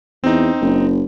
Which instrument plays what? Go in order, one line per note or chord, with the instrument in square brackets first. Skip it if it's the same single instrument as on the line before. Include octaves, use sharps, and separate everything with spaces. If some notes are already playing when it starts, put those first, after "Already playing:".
[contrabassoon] E2 [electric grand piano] C4 D#4
[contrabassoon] F#1